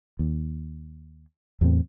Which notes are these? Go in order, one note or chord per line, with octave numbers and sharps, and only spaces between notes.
D#2
E2 A2 C4